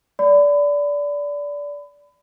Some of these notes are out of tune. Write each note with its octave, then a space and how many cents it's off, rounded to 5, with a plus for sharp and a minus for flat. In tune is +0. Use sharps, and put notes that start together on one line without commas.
D5 -20 B5 +30